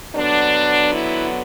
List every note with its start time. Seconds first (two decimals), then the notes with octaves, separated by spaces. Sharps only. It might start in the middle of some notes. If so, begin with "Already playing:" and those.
0.15 D3 F#3 B3 D4
0.92 E4